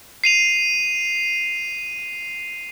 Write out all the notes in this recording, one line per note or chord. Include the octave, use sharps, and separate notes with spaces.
C7 D#7 F7